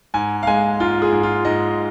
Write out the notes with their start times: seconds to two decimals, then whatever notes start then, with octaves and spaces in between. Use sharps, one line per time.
0.14 G#2 G#5
0.43 F5
0.47 G#3 G#5
0.80 G#2 F4
1.02 G#4
1.12 G#2
1.23 F4
1.45 G#2 D#5